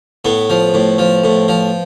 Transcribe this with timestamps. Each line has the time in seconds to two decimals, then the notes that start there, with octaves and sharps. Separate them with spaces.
0.25 A2 B3
0.50 F3
0.74 A2
0.98 F3
1.24 A2
1.48 F3